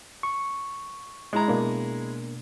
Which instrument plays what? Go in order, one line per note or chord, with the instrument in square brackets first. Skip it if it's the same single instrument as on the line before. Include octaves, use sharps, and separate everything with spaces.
[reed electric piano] C#6
[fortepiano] G#3 E4 A#5
[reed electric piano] B2 A#3 D4